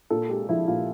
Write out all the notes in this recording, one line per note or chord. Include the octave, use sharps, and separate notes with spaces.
A#2 A4
G#3 G4
F3 E4
A#2 F4